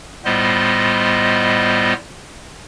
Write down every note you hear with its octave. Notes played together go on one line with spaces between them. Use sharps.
A2 G3 B3 F4 C5 D#5